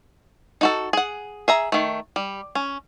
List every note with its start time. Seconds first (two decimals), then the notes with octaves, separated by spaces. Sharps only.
0.61 D#4 F#4 A4
0.93 G#4 F#5
1.48 G#4 E5 A#5
1.72 D#3 A3
2.16 G3
2.55 C#4